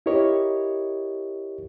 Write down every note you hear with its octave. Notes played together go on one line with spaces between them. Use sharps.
E4 G4 A#4 C#5 D#5